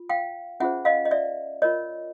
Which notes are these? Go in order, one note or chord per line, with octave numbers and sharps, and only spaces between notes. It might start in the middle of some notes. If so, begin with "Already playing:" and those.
Already playing: F4
F5 G5
C#4 F4 G#4 C5 E5 F#5
D#5 F5
D#5
D5 E5
F4 A#4 C#5 D#5